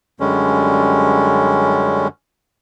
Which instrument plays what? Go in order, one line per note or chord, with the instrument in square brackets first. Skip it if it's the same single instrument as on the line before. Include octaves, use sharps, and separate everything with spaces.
[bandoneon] F#2 D3 G3 G#3 C#4